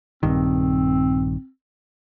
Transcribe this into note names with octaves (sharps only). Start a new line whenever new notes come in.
A#1 G2 D#3 C4